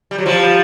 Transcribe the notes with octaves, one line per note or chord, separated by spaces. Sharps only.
G3
F#3
F3 G3